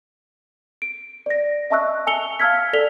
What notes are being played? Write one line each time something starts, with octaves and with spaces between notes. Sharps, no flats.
D7
D5 A#6
D#5 E5 A5 C#6 E6 F#6
G#5 A5 E6 C#7 F7 G7
F5 A5 E6 F6 G#6 B6
A4 D5 B6 F7 G7